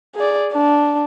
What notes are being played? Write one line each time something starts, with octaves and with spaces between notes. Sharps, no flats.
G#4 D5
D4